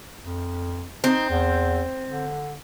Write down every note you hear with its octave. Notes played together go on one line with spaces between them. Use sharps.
F2
C4 D#4
E2
D3